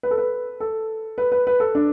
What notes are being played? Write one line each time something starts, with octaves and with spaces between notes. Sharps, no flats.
B4
A4
B4
A4
B4
B4
B4
A4
D4